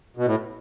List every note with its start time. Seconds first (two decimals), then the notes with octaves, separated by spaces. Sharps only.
0.17 B2
0.26 A2